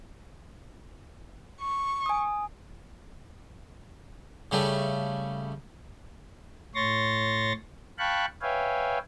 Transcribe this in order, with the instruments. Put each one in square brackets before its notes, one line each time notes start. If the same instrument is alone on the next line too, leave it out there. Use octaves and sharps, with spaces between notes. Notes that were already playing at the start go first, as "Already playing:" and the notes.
[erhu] C#6
[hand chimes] G#5 D#6
[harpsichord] C#3 G3 A3
[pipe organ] A2 C#5 C6 C#6 A6 A#6
F5 G5 A5 B5 C#6 F#6
B4 C#5 E5 F5 G5 G#5